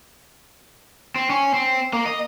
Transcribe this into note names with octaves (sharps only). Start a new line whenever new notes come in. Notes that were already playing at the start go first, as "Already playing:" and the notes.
C4
C#4
C4
A#3
D#5